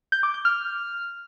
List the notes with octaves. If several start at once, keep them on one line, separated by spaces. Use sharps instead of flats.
G6
D6
G6
F6